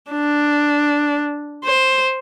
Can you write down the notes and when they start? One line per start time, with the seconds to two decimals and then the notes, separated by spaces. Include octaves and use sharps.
0.11 D4
1.65 C5